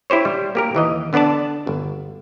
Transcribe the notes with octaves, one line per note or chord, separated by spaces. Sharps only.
E4 G4 C5 C#5
G3
A#3 G4 A#4
D#2 E3 D#5
D3 B3 D4 D5 A5
G1